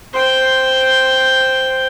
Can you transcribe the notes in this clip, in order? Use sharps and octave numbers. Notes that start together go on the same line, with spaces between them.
C5 G5